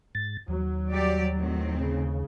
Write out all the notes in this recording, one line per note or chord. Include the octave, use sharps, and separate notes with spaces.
G#2 A6
D#2 F#3
G3 G4 D5
A2 D#3 C4
C#3